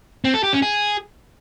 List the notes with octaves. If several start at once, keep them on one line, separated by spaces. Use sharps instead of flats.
C4
A4
G4
C#4
G#4